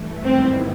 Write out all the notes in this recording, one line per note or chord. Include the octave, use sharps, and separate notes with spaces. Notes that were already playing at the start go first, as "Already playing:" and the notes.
Already playing: G2 E3 A3
G#2 D#3 G3 B3 C4 E4